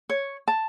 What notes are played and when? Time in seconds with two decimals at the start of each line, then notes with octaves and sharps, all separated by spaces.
0.09 C#5
0.48 A5